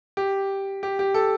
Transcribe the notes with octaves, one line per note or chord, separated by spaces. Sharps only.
G4
G4
G4
A4